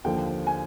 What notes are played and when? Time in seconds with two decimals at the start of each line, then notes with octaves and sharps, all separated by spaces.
0.04 D#2 D3 F3 G5
0.47 G#5